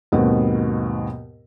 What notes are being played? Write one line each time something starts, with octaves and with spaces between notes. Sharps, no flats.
D#2 G#2 B2 F#3 B3 C4